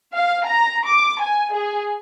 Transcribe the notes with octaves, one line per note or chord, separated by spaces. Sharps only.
F5
A#5
D6
G#5
G#4